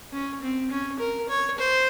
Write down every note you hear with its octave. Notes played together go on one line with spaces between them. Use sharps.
C#4
C4
C#4
A#4
C#5
C5